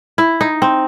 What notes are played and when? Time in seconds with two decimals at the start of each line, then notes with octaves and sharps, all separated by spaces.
0.18 E4
0.41 D#4
0.62 C4